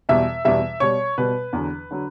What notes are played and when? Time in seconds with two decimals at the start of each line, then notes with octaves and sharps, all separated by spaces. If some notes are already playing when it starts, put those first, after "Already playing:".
0.09 E2 B2 G3 E5
0.45 E2 B2 G3 E5
0.80 B2 G3 C#5
1.18 B2 G3 B4
1.53 E2 D3 F#3
1.91 D3 F#3